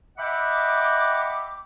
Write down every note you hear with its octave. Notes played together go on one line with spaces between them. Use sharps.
D#5 E5 F#5 G5 B5 D6